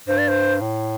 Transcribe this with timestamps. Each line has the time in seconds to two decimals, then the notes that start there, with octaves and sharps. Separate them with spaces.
0.08 G2 C5
0.18 D5
0.28 C5
0.61 A2